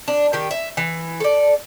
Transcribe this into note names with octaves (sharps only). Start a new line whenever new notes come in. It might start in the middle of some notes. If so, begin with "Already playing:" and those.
D4
D#3 G4
E5
E3
A4 D5